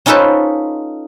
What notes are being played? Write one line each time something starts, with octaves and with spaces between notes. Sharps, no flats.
C#4 D#4 F4 A4 B4 C5